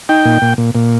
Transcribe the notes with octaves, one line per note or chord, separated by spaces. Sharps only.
D#4 G5
A#2
A#2
A#2
A#2